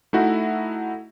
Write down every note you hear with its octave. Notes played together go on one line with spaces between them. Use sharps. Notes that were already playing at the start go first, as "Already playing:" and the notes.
A3 D#4 E4 F#4